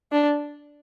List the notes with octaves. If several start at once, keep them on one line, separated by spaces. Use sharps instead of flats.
D4